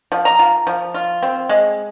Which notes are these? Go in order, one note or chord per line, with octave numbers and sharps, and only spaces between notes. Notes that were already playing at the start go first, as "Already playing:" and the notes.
F3
A#5
F4
F3
F4
C4
G#3